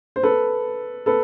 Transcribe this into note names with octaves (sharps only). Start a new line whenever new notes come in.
C5
A4 B4
A4 B4